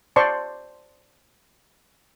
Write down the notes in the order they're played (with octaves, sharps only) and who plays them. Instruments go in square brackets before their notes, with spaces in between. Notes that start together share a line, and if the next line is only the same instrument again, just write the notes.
[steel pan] C5 D5 A5 C6 C#6